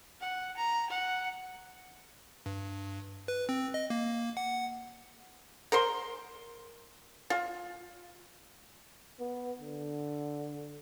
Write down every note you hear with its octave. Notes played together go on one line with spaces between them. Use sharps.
F#5
A#5
F#5
G2
B4
C4
D#5
A#3
F#5
A#4 C5 C6
F4
B3
D3